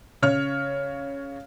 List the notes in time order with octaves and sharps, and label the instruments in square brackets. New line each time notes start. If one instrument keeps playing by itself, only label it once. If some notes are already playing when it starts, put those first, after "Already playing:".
[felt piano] C#3 C#5 F6